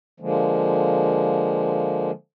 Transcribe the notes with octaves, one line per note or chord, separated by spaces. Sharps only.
D3 F3 G#3 A#3